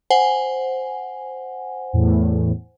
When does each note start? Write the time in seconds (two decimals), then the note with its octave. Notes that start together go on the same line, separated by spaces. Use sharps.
0.10 C5 F#5 G#5
1.93 E2 A2